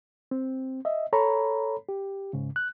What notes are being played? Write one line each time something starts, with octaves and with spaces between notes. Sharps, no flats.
C4
D#5 E5
A4 C#5 A#5 B5
G4
G#2 C#3
F#6